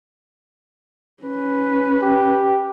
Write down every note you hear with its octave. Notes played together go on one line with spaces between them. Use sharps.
C#4 B4
G4